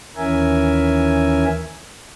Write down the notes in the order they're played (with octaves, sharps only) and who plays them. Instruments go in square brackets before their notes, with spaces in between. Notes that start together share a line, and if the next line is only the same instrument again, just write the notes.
[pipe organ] D#2 E3 C#4 A#4 E5 G#5